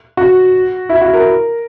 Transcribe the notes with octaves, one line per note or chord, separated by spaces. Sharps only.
F#4
E4
F#4
A#4